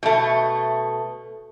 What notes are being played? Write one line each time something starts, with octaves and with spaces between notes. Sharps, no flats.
B2 A3